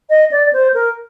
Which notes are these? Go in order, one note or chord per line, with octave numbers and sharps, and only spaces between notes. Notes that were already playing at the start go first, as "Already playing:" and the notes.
D#5
D5
C5
A#4